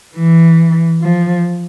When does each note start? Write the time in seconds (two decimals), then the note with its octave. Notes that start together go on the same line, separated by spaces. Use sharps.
0.16 E3
1.02 F3